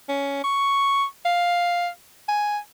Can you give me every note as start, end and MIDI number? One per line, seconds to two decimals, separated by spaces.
0.09 0.39 61
0.44 1.05 85
1.25 1.89 77
2.28 2.58 80